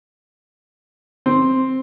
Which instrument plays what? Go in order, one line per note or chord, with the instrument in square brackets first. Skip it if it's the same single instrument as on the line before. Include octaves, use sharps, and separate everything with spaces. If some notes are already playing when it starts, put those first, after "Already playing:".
[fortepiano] C4